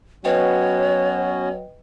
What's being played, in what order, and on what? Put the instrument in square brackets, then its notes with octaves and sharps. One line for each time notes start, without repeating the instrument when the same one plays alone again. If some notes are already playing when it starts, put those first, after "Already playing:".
[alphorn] F#3 [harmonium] B3 C#4 F#4 [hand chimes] B4 D#5 G5 [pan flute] C#5